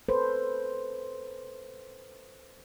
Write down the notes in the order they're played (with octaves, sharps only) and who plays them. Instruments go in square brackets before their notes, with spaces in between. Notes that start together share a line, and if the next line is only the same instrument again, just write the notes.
[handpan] A4 B4 C5